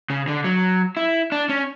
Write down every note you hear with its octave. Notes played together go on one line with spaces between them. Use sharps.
C#3
D3
F#3
E4
D4
C#4